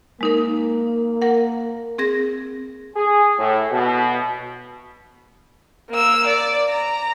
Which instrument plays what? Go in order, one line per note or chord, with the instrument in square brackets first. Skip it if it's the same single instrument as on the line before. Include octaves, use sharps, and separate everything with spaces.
[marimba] G#3 D#4 A#4 [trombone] A#3
[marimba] A#4 F#5
C4 G#4 A#6
[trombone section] G#4
A2
B2
[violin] A#3 E6
D5
A#5